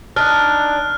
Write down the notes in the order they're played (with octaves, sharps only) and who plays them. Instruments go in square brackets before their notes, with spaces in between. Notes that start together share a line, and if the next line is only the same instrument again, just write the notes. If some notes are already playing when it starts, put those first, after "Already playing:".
[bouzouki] D4 D#4 [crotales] F6 F#6